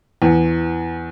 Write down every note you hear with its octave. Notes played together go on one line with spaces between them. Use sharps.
E2